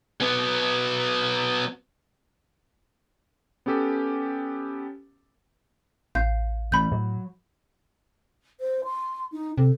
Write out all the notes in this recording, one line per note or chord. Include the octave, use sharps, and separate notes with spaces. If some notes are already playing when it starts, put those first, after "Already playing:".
F#3 B3
B3 C#4 G4 A4
A1 F5 G6
E3 A3 B5 G6
A2 F#3
C5
C6
D#4
C3 A4